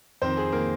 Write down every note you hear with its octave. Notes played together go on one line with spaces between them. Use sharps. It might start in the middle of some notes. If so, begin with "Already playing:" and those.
F2 D#3 C4 C5
G#4
D#3 A#3 A#4